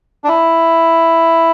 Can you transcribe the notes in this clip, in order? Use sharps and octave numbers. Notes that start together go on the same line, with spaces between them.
D4
E4